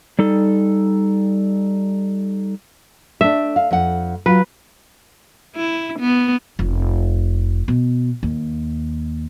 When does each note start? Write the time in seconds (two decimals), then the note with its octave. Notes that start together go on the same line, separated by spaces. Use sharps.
0.19 G3 D#4 A4
3.21 A3 D4 E5
3.56 F5
3.71 F2 F#5
4.26 F#3 F4 B4
5.56 E4
6.00 B3
6.59 F1
7.68 B2
8.23 D#2